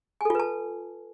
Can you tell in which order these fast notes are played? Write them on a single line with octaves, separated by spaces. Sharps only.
G#5 A4 F4 B4 A5